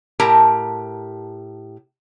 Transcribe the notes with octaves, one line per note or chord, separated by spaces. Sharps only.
A2 G4 A#4 A5 A#5